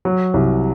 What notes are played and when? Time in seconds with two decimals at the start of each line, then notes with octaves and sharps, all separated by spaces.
0.05 F#3
0.34 C2